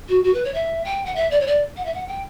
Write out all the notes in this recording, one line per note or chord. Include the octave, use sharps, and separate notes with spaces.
F#4
F#4
B4
C#5
E5
G5
F#5
E5
D5
C#5
D5
F#5
E5
F#5
G5